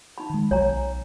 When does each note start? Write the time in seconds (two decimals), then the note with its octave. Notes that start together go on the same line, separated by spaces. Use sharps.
0.18 D#4 B5
0.30 D#3 G#3
0.51 B1 C#5 G#5 A#5